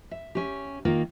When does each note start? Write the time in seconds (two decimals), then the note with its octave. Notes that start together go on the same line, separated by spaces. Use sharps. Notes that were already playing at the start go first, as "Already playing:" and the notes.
0.11 E5
0.35 C#4 G4
0.85 D#3 A#3 F4